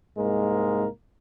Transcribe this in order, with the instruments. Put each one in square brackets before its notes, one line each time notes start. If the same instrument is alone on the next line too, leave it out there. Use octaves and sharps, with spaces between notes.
[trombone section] C2 G#2 G#3 A#3 A#4